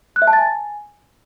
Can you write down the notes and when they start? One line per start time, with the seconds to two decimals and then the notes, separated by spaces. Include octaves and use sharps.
0.16 F#6
0.22 E5
0.27 A5
0.33 A6
0.39 G#5